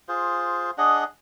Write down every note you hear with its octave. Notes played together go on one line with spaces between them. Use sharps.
F4 G#4 C5
D4 G#4 D#5 F#5